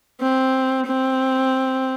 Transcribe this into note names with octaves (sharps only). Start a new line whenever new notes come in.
C4
C4